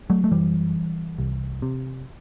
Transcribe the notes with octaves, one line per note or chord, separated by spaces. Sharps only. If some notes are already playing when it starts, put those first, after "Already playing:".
F#3 A3
A3
F#2 E3 G3
C2
C3